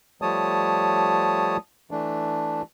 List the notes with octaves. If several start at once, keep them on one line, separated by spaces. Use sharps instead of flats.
F3 G3 A3 C#5 A5 D#6
E3 A3 D4